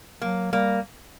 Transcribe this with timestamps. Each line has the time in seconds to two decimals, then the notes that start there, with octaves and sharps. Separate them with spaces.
0.22 F#3 A#3
0.52 G3 A#3